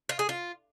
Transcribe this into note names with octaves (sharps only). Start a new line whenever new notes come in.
F4
G#4
F4